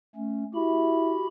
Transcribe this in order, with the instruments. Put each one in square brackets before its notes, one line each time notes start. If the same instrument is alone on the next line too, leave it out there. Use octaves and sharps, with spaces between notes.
[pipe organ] A3 C#4
[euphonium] E4 [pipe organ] F#4 G4 B5